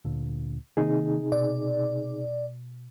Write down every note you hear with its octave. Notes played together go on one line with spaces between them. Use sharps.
D2 A#2 D3
C3 D#3 A#3 D#4 G#4
B2 D5